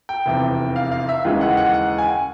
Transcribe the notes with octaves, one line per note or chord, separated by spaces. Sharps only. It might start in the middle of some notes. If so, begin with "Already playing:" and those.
G5
F1 E2 C3
F5
F5
E5
D#2 C#3 E3 G#3
F#5
F#5
F#5
G#5